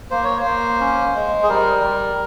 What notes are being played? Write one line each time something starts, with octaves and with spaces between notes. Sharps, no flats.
A#3 C5
C#5
C5
A#3
C#4
G#3
G#4
G3 A#4
G3